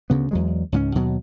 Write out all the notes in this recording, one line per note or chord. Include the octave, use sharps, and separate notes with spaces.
D2 C#3 B3
E2 F#3 G#3
C#2 G#2 G#3 C#4
D#2 B2 F#3